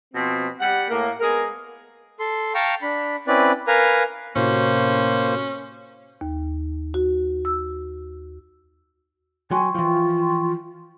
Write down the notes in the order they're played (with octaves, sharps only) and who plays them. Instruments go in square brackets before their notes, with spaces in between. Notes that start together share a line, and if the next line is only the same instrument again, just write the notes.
[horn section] B2 F3 C4
G3 F#5
A2 A#3
G#3 B3 G#4 A#4 G#5
[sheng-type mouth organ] A4 C6
F5 G5 A5 A#5 C#6
D4 B5
C4 C#4 E4 B4 D5
A#4 B4 F5 G#5 A#5
[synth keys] A2 C3 F#4 [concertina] A#3 C5 [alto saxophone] C#4
[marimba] D#2
F#4
E6
[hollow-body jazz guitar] F#3 [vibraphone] G5 C6 C#6 [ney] G#5
[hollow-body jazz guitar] E3 F3 [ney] F4